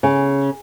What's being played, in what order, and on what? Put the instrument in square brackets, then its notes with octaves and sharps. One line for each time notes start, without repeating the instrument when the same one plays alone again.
[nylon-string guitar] C#3